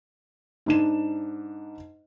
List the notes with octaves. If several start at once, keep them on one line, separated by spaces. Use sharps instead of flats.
G#2 D4 E7